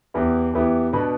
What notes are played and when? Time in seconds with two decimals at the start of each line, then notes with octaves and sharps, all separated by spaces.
0.14 E2 E3 B3 E4 G4
0.53 E2 E3 B3 E4 G4
0.93 B2 B3 D4 B4